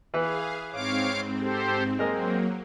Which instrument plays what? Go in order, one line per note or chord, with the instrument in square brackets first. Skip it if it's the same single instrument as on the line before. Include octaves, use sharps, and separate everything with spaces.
[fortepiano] E3 B4 [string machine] G#4 F5
[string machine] G#2 C4 [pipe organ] C#5 F5 D6
[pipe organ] G4 A4 C5
[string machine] F#3 A#3 [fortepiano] G#3 A#4 D#5 [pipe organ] C4